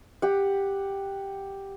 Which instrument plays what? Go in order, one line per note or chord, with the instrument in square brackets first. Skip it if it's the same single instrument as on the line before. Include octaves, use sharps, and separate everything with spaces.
[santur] G4 F#5